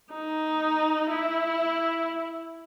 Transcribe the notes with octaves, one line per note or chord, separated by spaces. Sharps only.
D#4
E4